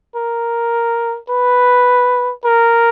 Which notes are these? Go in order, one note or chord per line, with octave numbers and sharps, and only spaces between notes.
A#4
B4
A#4